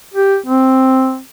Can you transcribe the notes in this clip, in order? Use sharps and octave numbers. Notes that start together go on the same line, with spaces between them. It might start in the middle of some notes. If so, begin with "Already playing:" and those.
G4
C4